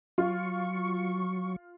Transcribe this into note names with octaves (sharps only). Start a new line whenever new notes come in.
F#3 F4 C#6